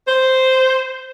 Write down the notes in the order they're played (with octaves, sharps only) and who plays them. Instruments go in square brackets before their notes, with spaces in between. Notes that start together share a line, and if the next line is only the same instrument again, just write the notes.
[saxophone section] C5